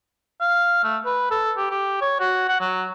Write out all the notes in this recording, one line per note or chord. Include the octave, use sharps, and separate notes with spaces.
F5
A3
B4
A4
G4
G4
C#5
F#4
F#5
F#3